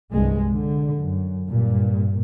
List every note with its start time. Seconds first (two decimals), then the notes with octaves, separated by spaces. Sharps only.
0.12 C2 G2 G#3
0.51 D3
0.96 F#2
1.48 G2 A#2